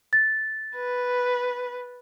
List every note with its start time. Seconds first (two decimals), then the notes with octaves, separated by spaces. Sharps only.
0.13 A6
0.75 B4